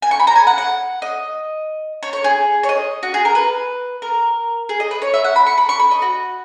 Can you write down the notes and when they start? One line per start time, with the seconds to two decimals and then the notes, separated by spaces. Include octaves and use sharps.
0.02 G#5
0.11 C#6
0.20 B5
0.27 A#5
0.36 G#5
0.47 F#5
0.58 F#5
1.02 D#5
2.03 C#5
2.13 C#5
2.24 G#4
2.63 C#5
2.69 D#5
3.03 F#4
3.14 G#4
3.25 A#4
3.35 B4
4.02 A#4
4.69 G#4
4.80 D#5
4.91 B4
5.02 C#5
5.14 E5
5.24 F#5
5.36 B5
5.46 C#6
5.58 B5
5.69 C#6
5.80 B5
5.91 D#5
6.02 F#4